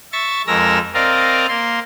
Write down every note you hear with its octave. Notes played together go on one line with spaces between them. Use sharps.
E5 C#6 A6
F2 G#3 A#4 E6 A#6
C4 A#4 D5 D#5 F5 A#5
A#3 C6